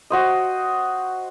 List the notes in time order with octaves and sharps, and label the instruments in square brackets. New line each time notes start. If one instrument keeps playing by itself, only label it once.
[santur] F#4 C5 D#5